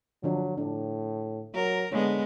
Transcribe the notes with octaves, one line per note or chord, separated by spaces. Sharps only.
D3 F3 F#3 D4
A2 D4
F#3 A#4
D3 G#3 B3 C#5